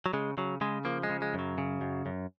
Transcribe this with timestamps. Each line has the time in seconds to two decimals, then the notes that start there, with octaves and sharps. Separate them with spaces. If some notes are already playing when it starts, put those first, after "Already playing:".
0.06 F#3
0.13 C#3 G#3
0.38 C#3 F#3
0.61 C#3 G#3
0.85 F3 A#3
1.03 G#3
1.10 C#3
1.22 G#3
1.34 F#2
1.39 F#3
1.58 C#3
1.81 F#2
2.06 F#2